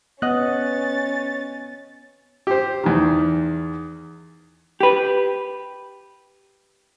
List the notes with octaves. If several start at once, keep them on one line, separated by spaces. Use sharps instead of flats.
B3 C#4 D#5 F#5 F#6 A6
G4 C5
E2 D#3
G4 B4